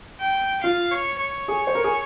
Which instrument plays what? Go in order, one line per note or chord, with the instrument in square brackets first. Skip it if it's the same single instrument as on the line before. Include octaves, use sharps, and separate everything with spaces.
[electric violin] G5
[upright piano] F4 [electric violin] F5
[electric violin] C#5
C#5
[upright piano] G#4
C5
A#4
G#4